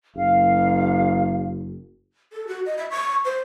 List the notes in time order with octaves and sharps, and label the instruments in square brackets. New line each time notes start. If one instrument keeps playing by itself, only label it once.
[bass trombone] F#1 [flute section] F5
[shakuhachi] A4
F#4
D#5
E5
C#6
C5